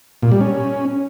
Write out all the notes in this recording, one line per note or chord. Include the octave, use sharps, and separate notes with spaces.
A#2
G3
C#4